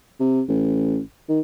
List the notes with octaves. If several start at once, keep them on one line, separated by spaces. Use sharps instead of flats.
C3
A1
D#3